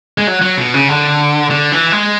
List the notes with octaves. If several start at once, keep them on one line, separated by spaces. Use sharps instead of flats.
G#3
F#3
F#3
B2
C#3
D3
D3
E3
G#3